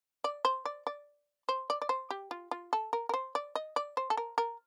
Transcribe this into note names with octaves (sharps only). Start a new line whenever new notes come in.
D5
C5
D5
D5
C5
D5
D5
C5
G4
F4
F4
A4
A#4
A#4
C5
D5
D#5
D5
C5
A4
A#4
A#4